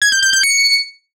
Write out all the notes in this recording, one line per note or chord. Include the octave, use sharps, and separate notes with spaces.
G#6
G6
G6
G6
C#7